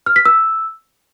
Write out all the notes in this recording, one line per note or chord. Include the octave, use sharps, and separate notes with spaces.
F6
B6
E6